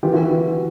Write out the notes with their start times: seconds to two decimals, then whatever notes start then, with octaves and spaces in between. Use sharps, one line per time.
0.03 E3 F4 G4
0.13 E4 F#4
0.18 E3